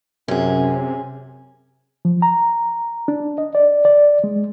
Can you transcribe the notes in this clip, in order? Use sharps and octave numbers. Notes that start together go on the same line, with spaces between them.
F#2 C3 C#4 G#4
F3
A#5
D4
D#5
D5
D5
G#3